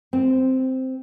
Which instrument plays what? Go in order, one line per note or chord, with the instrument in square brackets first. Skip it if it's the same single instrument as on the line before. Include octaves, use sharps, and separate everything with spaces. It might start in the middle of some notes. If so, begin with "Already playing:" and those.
[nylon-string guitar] C4